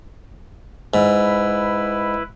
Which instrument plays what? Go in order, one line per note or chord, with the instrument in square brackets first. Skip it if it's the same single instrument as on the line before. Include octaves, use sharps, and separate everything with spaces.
[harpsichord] G#2 [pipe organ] E4 B4